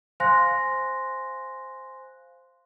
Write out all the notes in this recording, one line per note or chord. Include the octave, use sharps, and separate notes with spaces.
C5 F5 G#5 C6 F#6 A#6